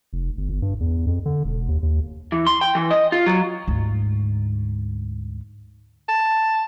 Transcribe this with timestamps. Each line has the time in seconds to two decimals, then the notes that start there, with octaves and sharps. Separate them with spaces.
0.13 F1
0.37 G1
0.49 G1
0.62 G2
0.80 E2
1.07 F2
1.25 D3
1.44 E1
1.69 D#2
1.83 D#2
2.32 E3
2.47 C6
2.61 G5
2.75 E3
2.91 D#5
3.12 F4
3.26 F#3
3.68 D2 G#2
6.08 A5